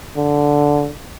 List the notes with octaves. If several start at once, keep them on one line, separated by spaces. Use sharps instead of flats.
D3